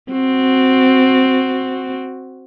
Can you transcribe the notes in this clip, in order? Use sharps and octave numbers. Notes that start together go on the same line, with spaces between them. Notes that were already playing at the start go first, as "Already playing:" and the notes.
C4 F#4